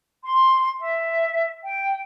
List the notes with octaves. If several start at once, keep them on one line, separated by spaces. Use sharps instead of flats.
C6
E5
G5